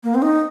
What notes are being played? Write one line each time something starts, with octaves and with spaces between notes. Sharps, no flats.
A#3
C4
D#4